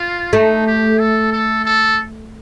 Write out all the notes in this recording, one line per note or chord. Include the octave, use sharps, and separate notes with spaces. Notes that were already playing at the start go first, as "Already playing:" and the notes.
Already playing: F4
A3 D#4
G4
A4
A4
A4